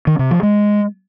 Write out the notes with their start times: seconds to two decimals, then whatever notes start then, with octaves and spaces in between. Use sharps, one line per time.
0.07 D#3
0.19 C3
0.31 F3
0.43 G#3